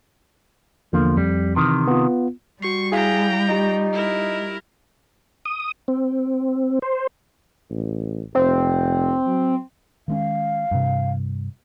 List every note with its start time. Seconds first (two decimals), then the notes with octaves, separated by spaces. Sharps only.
0.93 E2 D3 F3 A#3
1.17 F2 G3
1.56 C3 D#3 E3
1.87 B3 F4
2.62 G3 F#4 C#6 C7
2.92 E4 G#4 F5 G5 A#5 B6
3.49 D#4 F4 G4
3.93 E4 A#4
5.45 D#6
5.88 C4
6.82 C5
7.70 A1
8.35 F1 C4
9.26 F#3
10.08 D#3 G#3 C#4 F5
10.71 G2 C3